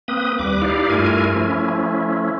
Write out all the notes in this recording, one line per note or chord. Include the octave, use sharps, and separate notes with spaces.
A#3 C4 B4 D#6
D#2 G3 B4 D6
D#4 E4 G4 D5 F5
G2 A3 E4 F4 A#4 G#5
F3 A3 C#4 E4